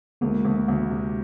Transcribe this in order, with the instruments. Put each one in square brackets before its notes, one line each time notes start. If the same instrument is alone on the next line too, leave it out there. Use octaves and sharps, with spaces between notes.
[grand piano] D2 [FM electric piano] G#3 A#3
[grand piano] D2
D2
C3